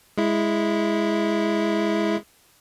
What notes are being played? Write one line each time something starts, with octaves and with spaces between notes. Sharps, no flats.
G#3 E4